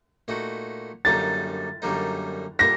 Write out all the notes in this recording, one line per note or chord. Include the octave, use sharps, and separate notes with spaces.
A#2 A3 D#4 F#4
F#2 D3 G3 A#3 D#4 A6
F#2 D3 G3 A#3 D#4
A#2 G3 D4 A#6